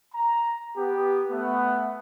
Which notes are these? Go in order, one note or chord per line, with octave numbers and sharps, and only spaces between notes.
A#5
B3 G4
A3 B3